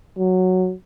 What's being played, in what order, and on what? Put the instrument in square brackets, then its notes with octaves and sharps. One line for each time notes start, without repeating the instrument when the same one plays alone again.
[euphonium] F#3